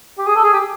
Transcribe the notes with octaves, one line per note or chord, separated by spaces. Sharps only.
G4
G#4
A4
G#4
G4